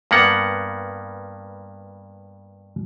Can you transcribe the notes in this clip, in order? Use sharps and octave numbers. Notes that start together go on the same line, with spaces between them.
G2 A#3 B3 F#5